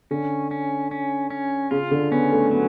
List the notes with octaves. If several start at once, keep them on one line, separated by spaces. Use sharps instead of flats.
D3 C#4
C#4
C#4
C#4
C#3 F4
D3
B3 C#4
A3
F#3 B3